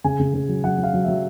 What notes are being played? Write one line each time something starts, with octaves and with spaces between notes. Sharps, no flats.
C#3 G#5
C#3
C#3
F#3
F#3 F#5
F#3
F5
F#3
F#3 E5